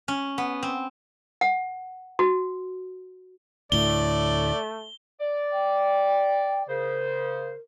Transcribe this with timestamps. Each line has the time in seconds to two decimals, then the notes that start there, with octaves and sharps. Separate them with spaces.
0.08 C#4
0.38 B3
0.63 C4
1.41 F#5
2.19 F#4
3.72 D2 A2 A3 D5 G7
5.20 D5
5.52 G5
6.69 C#3 A#4 C5